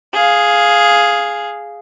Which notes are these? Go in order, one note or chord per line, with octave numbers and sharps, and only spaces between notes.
G#4 F5